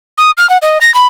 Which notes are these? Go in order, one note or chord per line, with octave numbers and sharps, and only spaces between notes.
D#6
F6
F#5
D#5
A#6
B5